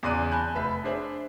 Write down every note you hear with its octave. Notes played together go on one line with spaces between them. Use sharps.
E2 C#3 D5 C6 F#6 D#7
G#5 A5 B5 F#6 G6
F1 B4 E5 B6
D4 G#4 C5 E5